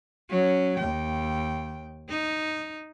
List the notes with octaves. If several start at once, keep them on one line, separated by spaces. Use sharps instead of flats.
F#3 C#4
D#2 G5
D#4